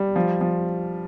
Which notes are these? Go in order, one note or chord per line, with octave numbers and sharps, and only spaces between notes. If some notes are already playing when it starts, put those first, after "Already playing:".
Already playing: G3
F3
F3